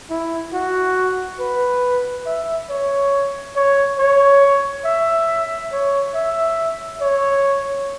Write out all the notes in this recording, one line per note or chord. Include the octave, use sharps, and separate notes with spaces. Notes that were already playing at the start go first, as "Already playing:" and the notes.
E4
F#4
B4
E5
C#5
C#5
C#5
E5
C#5
E5
C#5